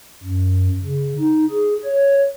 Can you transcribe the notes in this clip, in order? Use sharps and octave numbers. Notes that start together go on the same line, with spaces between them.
F#2
C#3
D#4
G#4
C#5